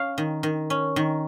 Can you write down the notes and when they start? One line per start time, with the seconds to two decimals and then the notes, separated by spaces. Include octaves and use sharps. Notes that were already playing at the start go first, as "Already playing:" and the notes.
Already playing: C#4 F5
0.18 D#3
0.43 D#3
0.70 C#4
0.96 D#3